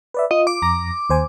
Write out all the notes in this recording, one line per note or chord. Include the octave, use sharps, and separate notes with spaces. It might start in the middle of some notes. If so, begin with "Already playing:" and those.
B4 D5 E5
F4 D#5
D6
F2 A#5 A#6
D#2 C5 G#5